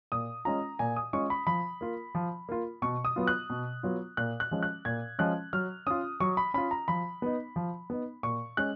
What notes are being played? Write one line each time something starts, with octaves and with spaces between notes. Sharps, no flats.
A#2 D#6
G#3 C#4 F4 A#5
A#2 G#5
D#6
G#3 C#4 F4 C#6
B5
F3 B5
A#3 F4
F3
A#3 F4
B2 C#6
D#6
F#3 B3 F4
F#6
B2
F#3 B3 F4
A#2 F#6
F#6
F3 G#3 C#4
F#6
A#2 G#6
F3 G#3 C#4 F#6
F#3 F6
C#4 F4 D#6
F#3 C#6
B5
C#4 F4 B5
A#5
F3 B5
B3 D#4
F3
B3 D#4
A#2 C#6
G#3 C#4 F#6